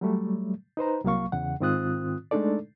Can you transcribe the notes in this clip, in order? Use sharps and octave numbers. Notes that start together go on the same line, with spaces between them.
F#3 G3 A3
D#4 B4 C5 A#5
C2 F#3 A#3 F5 C#6
E2 C#3 F#5
G#2 D#3 C4 F4 D#6 F#6
G#3 A3 D4 D#4 A4 D5